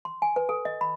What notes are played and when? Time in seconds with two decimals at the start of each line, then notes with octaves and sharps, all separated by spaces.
0.05 C6
0.22 G#5
0.36 B4
0.49 A4
0.65 D#5
0.81 B5